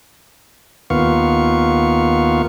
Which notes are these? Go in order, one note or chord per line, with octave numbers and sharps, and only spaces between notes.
D#2 B3 F4 F5 C#6